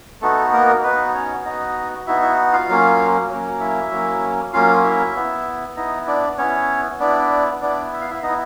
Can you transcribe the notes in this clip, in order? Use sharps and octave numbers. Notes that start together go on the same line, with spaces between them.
A3 B3 D#4 F#4 A4
A#3 A#4
B3 D#4 F#4 B4
C#4 C#5
B3 D#4 F#4 D#5
B3 D#4 E4 F#4 E5
E4 E5
F4 F5
F#3 A#3 C#4
F#3 A#3 C#4
E4 E5
F#3 A#3 C#4
F#3 A#3 C#4 F4 F5
E4 E5
B3 E4
B3 D#4 E4 D#5
D4 D5
B3 C#4 E4 C#5
B3 D4 E4 D5
B3 D4 E4 D5
E5
F5
E4 E5
B3 D#4 D#5
E4